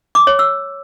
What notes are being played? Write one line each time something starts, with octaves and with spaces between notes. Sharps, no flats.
D6
C#5
E6